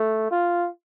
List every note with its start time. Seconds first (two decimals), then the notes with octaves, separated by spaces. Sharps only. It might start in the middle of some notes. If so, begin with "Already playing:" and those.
Already playing: A3
0.31 F4